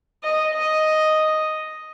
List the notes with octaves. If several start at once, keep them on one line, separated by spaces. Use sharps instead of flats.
D#5
D#5